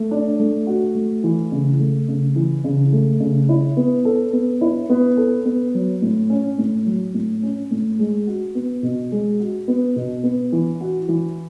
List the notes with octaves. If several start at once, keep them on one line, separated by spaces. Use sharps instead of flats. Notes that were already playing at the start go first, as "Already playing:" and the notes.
Already playing: A3
D4
A3
F#4
A3
E3
C#3
A3
C#3
E3
C#3
A3
C#3
E4
B3
A4
B3
E4
B3
A4
B3
F#3
A2
C#4
A2
F#3
A2
C#4
A2
G#3
F#4
B3
B2
G#3
F#4
B3
B2
B3
E3
F#4
E3